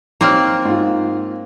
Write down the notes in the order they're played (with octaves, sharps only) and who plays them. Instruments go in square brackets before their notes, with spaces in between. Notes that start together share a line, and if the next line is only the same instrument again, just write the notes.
[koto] A#3 C4 [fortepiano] D#4 C#5 F6
[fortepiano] G#2 F4